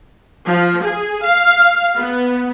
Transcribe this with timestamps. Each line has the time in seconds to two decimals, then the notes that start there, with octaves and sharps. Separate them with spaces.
0.47 F3
0.83 G#4
1.22 F5
1.99 B3